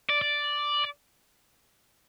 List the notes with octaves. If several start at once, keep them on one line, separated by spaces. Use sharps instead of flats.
D5
D5